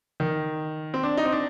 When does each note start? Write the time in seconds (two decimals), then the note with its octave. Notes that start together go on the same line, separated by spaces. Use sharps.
0.20 D#3
0.94 C4
1.03 D4
1.17 D#4
1.25 C4
1.32 D4